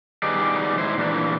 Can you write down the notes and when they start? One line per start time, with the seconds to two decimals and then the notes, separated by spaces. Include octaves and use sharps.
0.23 D#3 G3 B3 D#4 G#4 D5
0.78 G#2 E4 C5
0.98 A#2 E3 D4